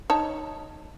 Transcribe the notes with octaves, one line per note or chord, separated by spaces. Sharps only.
D#4 C#5 A5